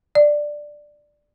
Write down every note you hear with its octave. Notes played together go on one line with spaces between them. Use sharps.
D5